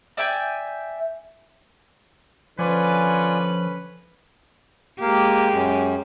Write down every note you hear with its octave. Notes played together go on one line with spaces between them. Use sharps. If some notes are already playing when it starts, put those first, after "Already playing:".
D5 E5 G5 G#5
D3 F3 C#4 F4 B4 D5 G#5
G#3 A#3 G4
F#2